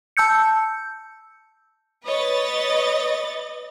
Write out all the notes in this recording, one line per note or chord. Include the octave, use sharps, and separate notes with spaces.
A5 E6 G6 C#7
B4 C#5 D#5 A6